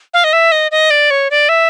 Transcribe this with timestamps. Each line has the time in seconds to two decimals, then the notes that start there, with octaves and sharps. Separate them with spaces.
0.14 F5
0.24 D#5
0.33 E5
0.52 D#5
0.71 D#5
0.90 D5
1.11 C#5
1.31 D5
1.49 E5